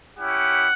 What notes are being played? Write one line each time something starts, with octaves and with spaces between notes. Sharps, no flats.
C#4 E4 G4 F#5